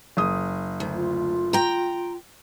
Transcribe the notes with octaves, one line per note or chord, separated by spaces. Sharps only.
F#1 D#6
D2
F4
G5 A#5